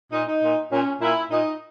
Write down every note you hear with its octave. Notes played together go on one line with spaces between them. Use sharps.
A#2 D#4
D#4
A#2
A#2 C#4
A#2 E4
A#2 D#4